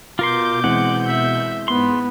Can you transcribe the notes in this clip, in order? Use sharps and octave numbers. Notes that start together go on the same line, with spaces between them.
B2 F4 A#4 C6 D6 G6
E3 G#3 C4 F#5
E5
G#2 B3 C6